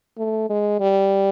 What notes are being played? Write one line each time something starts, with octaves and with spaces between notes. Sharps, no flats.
A3
G#3
G3